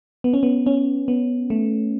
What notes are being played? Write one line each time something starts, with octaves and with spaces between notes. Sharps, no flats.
B3
C#4
B3
C#4
B3
A3